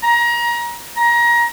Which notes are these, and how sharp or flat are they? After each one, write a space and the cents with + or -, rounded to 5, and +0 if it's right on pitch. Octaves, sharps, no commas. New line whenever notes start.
A#5 +30
A#5 +25